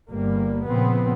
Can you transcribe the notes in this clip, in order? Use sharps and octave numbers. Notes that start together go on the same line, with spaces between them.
G1 G3 A#3
A#2 C#3 F3 B3 C4